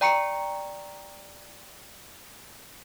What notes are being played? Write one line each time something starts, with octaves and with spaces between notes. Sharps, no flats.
D5 G5 A#5 C#6 C#7